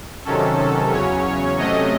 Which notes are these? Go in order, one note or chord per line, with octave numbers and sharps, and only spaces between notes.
C3 D#3 F#3 C#4 A4
A4
E2 C#3 F#3 C#4 C#5
C#5
C3 F#3 A3 C#4 D#5